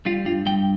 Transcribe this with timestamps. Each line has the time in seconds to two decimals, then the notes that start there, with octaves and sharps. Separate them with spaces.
0.06 G3 F4
0.25 G2 F4
0.46 G2 G5